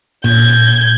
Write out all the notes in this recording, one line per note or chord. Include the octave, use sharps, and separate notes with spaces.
A#2 G6 G#6